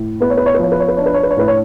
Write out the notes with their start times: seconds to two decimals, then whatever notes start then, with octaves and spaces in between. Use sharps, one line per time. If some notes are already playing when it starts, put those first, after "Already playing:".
Already playing: A2
0.20 B3 B4
0.30 C#5
0.37 B4
0.46 C#5
0.55 B4
0.59 F3 C#5
0.72 B4
0.80 C#5
0.88 B4
0.97 D4 C#5
1.06 B4
1.14 C#5
1.23 B4
1.31 C#5
1.36 A2 B4
1.48 C#5